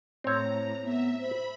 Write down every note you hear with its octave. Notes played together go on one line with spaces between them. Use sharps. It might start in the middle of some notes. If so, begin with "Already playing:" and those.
A2 C4 C#5 A#5
B3 E5
C5 B5